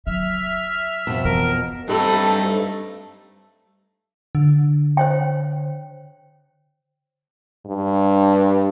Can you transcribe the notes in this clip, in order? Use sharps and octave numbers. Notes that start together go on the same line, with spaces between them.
F#3 E5 F6
F2 B2 A5
E3 A#4
G2 A3 C4 D#4 G4 A4 B5
D3
C5 C#5 G5
G2